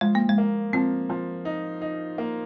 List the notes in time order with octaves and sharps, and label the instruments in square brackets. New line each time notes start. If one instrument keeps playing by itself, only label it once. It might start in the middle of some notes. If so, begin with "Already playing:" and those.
[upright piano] F3 [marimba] G#3
[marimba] A#3
G#3
[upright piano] A#3
[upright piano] F3 [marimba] C4
[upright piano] F3
D#4
D#4
A#3